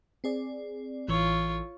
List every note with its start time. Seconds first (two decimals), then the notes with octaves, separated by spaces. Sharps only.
0.24 C4 G#4 D5
1.08 A1 E3 F4 C#5